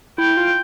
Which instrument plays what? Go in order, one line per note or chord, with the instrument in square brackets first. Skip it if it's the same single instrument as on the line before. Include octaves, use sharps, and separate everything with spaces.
[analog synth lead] E4 [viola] G5
[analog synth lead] F4